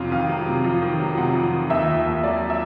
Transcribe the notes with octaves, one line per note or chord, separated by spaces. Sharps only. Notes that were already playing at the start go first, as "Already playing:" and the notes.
Already playing: F2 C3 F#3 F5
D#3 F5
F#3
C3
F2
D#3
F#3
C3 F#5
F2
D#3
D#2 E5
D#3
D#2
F#3 D5
E5